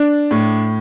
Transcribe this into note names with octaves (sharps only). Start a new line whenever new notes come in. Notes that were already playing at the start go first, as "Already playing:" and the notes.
Already playing: D4
A2